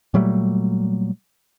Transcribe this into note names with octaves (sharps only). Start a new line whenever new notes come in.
A#2 F#3 G3 A3